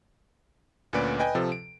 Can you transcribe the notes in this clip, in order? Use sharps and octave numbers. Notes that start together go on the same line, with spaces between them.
D2 A#2 C#4 B4 D5 D7
B4 D#5 G5 G#5
C3 F3 A4
D7